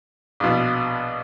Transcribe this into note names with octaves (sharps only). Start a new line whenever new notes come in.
A#1 B2